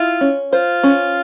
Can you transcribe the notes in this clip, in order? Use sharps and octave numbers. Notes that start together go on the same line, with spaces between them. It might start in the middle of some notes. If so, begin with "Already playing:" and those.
Already playing: E4 F4
C#4
F4 C5
C#4